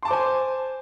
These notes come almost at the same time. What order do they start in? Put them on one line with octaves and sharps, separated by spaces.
C6 A5 D6 C5 G#5